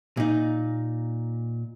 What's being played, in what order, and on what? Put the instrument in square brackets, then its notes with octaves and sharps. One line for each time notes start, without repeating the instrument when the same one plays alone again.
[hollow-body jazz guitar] A#2 D#4